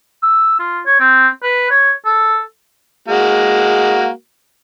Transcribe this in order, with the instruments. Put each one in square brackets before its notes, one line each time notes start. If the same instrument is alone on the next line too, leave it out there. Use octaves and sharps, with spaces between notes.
[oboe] E6
F4
C#5
C4
B4
C#5
A4
[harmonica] G#3 A#3 F#4